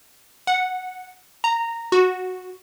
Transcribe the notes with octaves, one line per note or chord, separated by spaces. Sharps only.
F#5
A#5
F#4